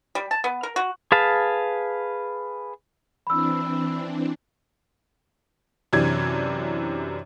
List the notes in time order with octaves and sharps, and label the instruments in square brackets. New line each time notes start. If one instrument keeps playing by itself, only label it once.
[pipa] G3
A5
B3
A#4
F#4
[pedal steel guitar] G#4 B4 F5 A5
[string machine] E3 C4 D4 [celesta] B5 E6
[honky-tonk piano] F#2 C3 E3 D4 G#6